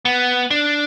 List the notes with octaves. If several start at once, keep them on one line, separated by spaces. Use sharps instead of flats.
B3
D4